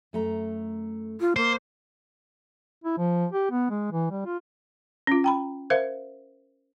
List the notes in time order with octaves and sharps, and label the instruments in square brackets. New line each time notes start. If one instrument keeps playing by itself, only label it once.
[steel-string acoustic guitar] F#2 A3 A#5
[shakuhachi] F4
[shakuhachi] A#3 [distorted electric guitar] C5
[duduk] E4
F3
G4
B3
G#3
E3
G3
F4
[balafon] C#4 F4
G5 A#5 B5
A#4 C5 E5 F5